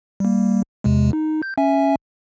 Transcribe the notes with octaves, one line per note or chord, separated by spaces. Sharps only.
G3 A#3
E2 C3 G#3
D#4
G6
C#4 E5 G#5